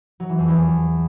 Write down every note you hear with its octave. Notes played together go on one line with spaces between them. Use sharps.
F#3
E3
F2
E2